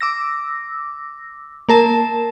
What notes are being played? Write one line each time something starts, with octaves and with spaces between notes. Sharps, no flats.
D6 E6 A#6
A#3 A#4 A5 E7